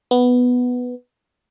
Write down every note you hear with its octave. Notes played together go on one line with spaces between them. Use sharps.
B3